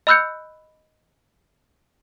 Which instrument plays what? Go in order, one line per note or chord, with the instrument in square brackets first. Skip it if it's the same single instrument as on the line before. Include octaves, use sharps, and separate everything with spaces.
[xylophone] D#5 B5 E6 F#6 G6 C#7